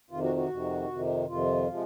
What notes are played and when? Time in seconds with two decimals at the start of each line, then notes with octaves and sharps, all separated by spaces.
0.10 F2 C3 D#3 F4
0.22 F#4
0.37 F#4
0.49 F2 C3 D#3
0.89 F2 C3 D#3
1.28 F2 C3 D#3 F4
1.68 C3 F3 G#3